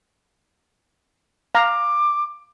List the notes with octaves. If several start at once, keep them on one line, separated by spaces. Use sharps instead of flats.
F5 A#5 D6